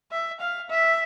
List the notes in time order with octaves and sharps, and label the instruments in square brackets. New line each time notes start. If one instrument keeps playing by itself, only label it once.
[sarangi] E5
F5
E5